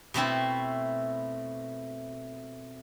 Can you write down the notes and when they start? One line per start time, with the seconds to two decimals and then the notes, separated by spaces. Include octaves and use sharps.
0.14 B2 A3 C4 E4